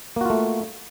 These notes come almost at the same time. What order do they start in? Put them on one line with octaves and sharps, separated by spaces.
A#3 F#4 F4 A3